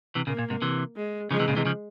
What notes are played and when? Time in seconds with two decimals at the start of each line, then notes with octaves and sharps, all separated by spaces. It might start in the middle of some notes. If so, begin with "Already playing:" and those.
0.15 C3 E3
0.27 A#2 C#3 A#3
0.39 A#2
0.50 G#2 C3
0.62 C3 E3
0.96 G#3
1.31 C#3 F3 G#3
1.40 C3 E3
1.48 A#2 C#3
1.57 C3 E3
1.65 C#3 F3